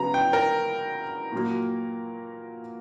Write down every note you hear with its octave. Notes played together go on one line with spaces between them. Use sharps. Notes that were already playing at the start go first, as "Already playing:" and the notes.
Already playing: C#3 F#3 B3 A#5
G5
A#4
A#2 F#3 A#3